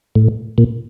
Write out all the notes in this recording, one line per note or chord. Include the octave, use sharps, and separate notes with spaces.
A2
A#2